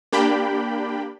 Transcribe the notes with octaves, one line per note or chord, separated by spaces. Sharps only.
A#3 D4 G4 G5 B5